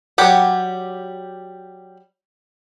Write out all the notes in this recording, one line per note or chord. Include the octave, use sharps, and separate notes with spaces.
F#3 G3 G4 F#5